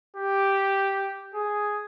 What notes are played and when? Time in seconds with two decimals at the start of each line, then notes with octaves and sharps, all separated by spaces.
0.17 G4
1.35 G#4